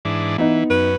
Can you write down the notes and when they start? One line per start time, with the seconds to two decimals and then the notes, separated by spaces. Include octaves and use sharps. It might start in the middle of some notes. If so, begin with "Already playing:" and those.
0.05 G#2 E3 D4
0.38 E3 B3 D#4
0.70 F#2 B4